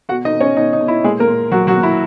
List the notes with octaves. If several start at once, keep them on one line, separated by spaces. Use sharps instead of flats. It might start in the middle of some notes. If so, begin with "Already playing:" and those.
B2 F#4 F#5
D#4 D#5
B2
C#4 C#5
B2 D#4
D#4
B2
E4
A#2 G#3 G#4
A#3 A#4
A#2
A#2 F#3 F#4
F#3 F#4
A#2
E4